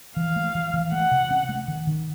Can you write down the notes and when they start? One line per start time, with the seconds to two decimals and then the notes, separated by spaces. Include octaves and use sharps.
0.16 E3 F5
0.36 A3
0.55 E3
0.74 E3
0.92 A3 F#5
1.11 C3
1.31 C#4
1.49 A3
1.68 D#3
1.87 D#3